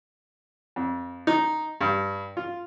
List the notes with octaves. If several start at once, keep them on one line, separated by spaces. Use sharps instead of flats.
F2
D#4
G2
F4